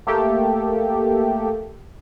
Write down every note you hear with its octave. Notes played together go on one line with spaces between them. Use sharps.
A3 A#3 G4 A4